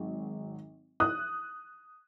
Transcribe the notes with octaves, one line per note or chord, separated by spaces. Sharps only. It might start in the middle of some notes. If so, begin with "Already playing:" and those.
Already playing: G#1 F#3
D#6 F#6